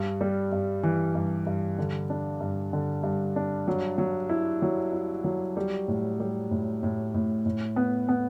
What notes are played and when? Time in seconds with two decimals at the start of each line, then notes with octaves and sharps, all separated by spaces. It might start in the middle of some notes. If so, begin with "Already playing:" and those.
Already playing: G2
0.21 G3
0.52 G2
0.83 E3
1.15 G2
1.46 G2
1.78 D3
2.10 D4
2.40 G2
2.73 D3
3.03 G2
3.36 D4
3.68 F#3
3.98 F#3
4.29 E4
4.62 F#3
4.93 E4
5.24 F#3
5.57 G3
5.88 A2
6.20 G3
6.51 A2
6.83 A2
7.14 A2
7.46 A2
7.76 B3
8.09 B3